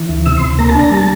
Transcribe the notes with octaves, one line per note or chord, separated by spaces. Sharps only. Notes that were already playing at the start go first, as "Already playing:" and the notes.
Already playing: E3
D2
C3 E6
C6
D2
A#3 A#5
A5
D4 A#5
G3 A5